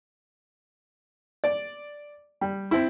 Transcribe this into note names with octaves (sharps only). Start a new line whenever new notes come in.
D5
G3
C4 E4